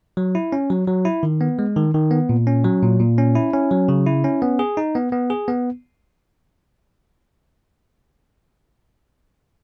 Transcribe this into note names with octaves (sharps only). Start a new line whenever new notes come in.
F#3
E4
C#4
F#3
F#3
E4
D#3
B3
G#3
D#3
D#3
B3
A#2
C#4
F#3
A#2
A#2
C#4
E4
C#4
F#3
C#3
E4
C#4
B3
G#4
D#4
B3
B3
G#4
B3